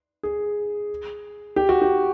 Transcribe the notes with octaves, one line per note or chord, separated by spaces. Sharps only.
G#4
G4
F#4
G4